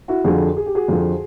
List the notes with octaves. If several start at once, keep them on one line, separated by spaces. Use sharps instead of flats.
E4 F#4
F2 D3 F3 F#4 G#4
G#4
G4
F#4 G#4
F2 D3 F3